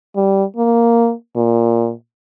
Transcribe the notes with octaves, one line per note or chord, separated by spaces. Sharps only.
G3
A#3
A#2